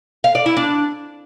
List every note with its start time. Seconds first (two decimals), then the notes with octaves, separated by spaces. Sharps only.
0.24 F5
0.35 D5
0.46 E4
0.57 D4